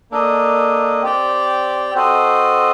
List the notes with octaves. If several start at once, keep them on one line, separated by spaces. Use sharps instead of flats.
A#3 D4 A4 D#5
C4 G4 D5 G5
C4 F#4 A4 C5 D#5